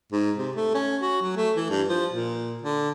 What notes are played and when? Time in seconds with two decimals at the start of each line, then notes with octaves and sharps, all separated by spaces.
0.13 G#2
0.38 C3
0.56 A3
0.75 C#4
1.02 F#4
1.22 F#3
1.37 A3
1.56 E3
1.70 G2
1.89 F3
2.13 A#2
2.62 D3